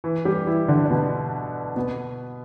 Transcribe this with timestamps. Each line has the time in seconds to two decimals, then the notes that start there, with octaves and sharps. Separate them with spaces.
0.04 E3 E4
0.25 G3 G4
0.47 E3 E4
0.68 D3 D4
0.85 D4
0.90 B2 B3
1.76 B2 B3